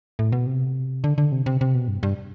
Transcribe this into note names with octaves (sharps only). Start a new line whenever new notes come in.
A2
B2
C3
D3
D3
C3
C3
C3
B2
G2
G2